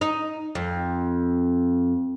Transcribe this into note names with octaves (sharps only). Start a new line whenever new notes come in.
D#4
F2